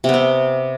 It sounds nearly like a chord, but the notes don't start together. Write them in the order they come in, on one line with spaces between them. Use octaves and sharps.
C3 B3 C4